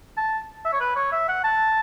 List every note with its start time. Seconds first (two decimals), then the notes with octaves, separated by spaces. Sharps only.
0.17 A5
0.65 E5
0.73 C#5
0.80 B4
0.96 C#5
1.12 E5
1.28 F#5
1.44 A5